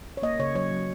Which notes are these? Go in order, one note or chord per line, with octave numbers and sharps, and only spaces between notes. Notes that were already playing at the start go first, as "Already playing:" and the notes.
C#5
A#3 D#5
C#3 C#5
F#3 C#5
F#3